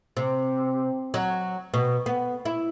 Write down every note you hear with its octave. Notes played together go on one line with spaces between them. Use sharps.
C3
F#3
B2
B3
E4